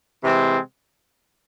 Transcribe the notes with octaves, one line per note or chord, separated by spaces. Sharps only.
C3 E3 G#3 C4